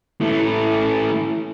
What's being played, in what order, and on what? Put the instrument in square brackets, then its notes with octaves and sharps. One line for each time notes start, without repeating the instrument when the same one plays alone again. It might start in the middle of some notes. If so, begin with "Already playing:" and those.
[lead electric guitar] E3 A3